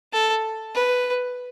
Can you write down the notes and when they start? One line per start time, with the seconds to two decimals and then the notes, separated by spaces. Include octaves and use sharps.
0.13 A4
0.75 B4